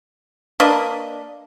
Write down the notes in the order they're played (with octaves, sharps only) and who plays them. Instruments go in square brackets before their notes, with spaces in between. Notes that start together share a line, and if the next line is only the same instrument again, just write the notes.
[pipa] A#3 D4 B4 D#5